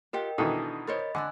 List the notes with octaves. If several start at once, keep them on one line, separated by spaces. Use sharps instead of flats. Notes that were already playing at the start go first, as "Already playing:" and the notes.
F4 G4 A#4 D#5 F#5 G5
B2 D#3 E3 D4 A4
A#4 C5 C#5 D#5 B5 A6
D3 D5 G#5 E6 F#6